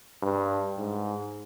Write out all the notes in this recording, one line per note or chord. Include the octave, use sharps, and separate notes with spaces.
G2
G#2